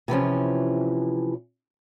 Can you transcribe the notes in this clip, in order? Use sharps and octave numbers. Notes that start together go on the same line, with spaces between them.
C3 E3 F3 C#4